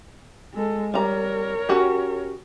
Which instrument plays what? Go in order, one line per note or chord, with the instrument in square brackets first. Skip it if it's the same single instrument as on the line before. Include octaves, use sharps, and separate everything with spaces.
[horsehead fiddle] G#3 A4
[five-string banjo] G3 A#5 [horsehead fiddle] A#4 C#5
[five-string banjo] C#4 F#4 G4